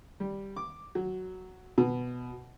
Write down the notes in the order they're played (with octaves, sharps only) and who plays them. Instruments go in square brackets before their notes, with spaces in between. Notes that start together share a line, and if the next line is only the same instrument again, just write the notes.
[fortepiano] G3
D6
F#3
B2